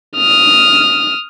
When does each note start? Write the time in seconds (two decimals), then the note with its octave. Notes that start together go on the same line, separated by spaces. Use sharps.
0.17 D#6 F6